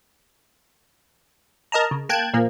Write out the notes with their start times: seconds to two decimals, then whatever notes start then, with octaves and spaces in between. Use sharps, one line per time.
1.72 A#4 D#5 A5 A#5
1.91 C#3
2.09 A#3 G5 A5 F#6 G#6
2.34 A#2 F3 A#3